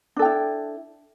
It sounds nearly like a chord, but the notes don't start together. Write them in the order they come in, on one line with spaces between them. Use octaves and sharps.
D4 A4 G5 E4